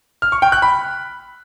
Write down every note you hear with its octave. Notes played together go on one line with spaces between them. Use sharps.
F6
C#6
G5
F#6
B5